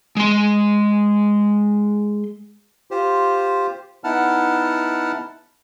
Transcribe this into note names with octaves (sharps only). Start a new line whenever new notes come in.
G#3 C6
F4 G4 C5
B3 D#4 E4 F#5 A5 F6